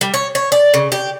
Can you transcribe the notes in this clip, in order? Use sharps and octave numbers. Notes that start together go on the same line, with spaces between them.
G3
C#5
C#5
D5
C#3
G4